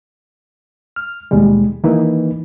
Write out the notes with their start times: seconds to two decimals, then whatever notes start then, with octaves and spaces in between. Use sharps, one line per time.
0.96 F6
1.31 D#2 B2 G3 G#3
1.84 D#3 E3 A#3 D#4 E4 B4